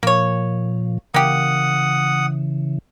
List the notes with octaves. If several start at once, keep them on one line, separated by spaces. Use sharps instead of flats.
A#2 F3 A#3 C#5
C#3 E3 A#3 G4 F#5 D#6